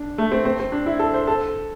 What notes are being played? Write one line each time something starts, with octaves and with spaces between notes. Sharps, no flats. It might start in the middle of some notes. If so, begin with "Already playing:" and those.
Already playing: D4
A3
C4
C4
C4
D4
E4
A4
C5
A4